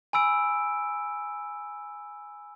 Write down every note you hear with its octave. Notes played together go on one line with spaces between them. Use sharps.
G#5 B5 E6 D7